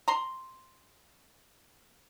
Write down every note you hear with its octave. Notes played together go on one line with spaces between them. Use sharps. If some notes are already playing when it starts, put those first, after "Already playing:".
A#5 C6